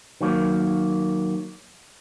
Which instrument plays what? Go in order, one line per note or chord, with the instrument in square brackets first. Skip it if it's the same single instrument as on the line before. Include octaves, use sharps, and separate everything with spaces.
[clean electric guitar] D#3 F#3 A#3